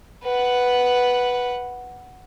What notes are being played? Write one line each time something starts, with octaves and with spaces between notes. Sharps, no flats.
B4 F#5